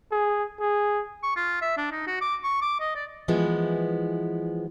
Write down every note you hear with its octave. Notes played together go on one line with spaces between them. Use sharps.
G#4
G#4
C#6
F4
E5
D4
D#4
F#4
D6
C#6
D6
D#5
D5
E3 F3 G#3 B3 E4